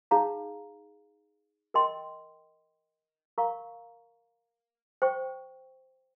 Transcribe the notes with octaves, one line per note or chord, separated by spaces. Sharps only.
D#4 G#4 C#5 F5 A#5
A#4 D#5 G5 C6
A#4 F5 A#5 C#6
C5 G5 C#6